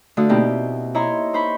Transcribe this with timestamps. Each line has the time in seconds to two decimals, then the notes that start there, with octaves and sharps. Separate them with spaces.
0.17 D3 A3 F#4 F5 D#6
0.29 B2 A#3 C4 D#4 E4 G4
0.95 E4 C#5 D#5 A#5 C6
1.33 D#4 C5 B5 C#6